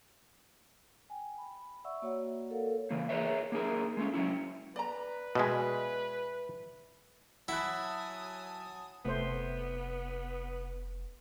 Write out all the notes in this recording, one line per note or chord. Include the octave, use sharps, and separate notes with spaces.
G5 G#5
B5
D5 E5 F#5 C#6 E6
A#3 F#4 C#5 D5 F#5
A4 A#4 C#5 D5 F5
C#3 E3 A#3
G#4 A#4 B4 C#5 E5
A#3 D#4 G#4 A#4
G#3 A3 C#4
F#3 C#4 E4
B4 D5 A#5
B2 G#3 D5 E5 G#5
F#3 E4 F#5 G#5 A5 B5 D#6 F#6
F1 C3 A3 B3 C5